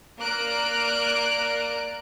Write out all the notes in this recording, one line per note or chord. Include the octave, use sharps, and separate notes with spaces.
A#3 A#4 D5 F#6 D7